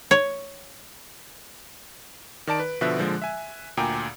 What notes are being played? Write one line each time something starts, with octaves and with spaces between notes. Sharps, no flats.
C#5
D#3 D5 A5 D7
B4
B2 D3 F3 B4 E5 F#6
A#2 D3 F3 G#3
E5 G#5
D2 A#2 G5 G#5 A#5 D6